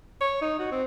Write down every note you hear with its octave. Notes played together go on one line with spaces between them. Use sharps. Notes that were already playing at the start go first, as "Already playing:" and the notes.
C#5
D#4
F#4
C4